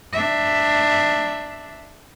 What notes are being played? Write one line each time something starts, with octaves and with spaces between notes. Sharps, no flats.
D4 E5